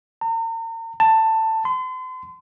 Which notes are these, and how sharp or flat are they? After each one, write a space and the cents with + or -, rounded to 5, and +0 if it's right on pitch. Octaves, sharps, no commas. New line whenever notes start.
A#5 -40
A5 +15
C6 -40